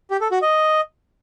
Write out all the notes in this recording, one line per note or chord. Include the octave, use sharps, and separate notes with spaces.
G4
A4
F#4
D#5